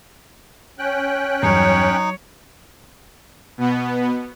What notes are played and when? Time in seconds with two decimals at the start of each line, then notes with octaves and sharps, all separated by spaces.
0.79 C#4 G5 F#6
1.43 E2 G2 F#3 D#4 C#5
3.58 B2 B3